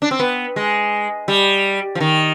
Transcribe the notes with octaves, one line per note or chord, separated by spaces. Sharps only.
D4
C4
B3
G#3
G3
F3
D#3